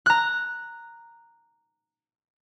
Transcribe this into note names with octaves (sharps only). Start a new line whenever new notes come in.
A#5 F#6